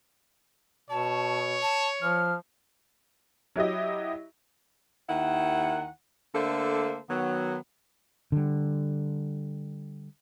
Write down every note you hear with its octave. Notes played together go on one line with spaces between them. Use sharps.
B2 C#5 A5
A5
F3 F6
F#3 E4 G4 D#5
D#2 D#3 E4 F#5
D3 A3 A#3 D4 A4 C5
D#3 F#3 B3
D3 G3